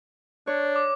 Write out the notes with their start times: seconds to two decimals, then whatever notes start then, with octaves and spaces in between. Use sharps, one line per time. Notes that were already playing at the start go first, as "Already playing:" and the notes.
0.47 D4 C#5
0.76 D6